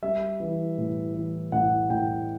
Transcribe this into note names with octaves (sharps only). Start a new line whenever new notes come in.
G3 E5
E3
A2
E3
A2 F#5
A2 G5